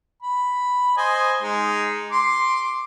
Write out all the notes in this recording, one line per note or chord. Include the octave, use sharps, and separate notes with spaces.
B5
C5 D#5 G#5
G#3 D#4
C6 D6